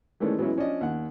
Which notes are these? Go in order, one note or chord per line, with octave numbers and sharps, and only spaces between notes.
D#3 E3 G#3 A3 C#4 D4
E3 F#3 G#3 B3 C#4 E4
F3 C#4 D4 D5 D#5
D#2 F#5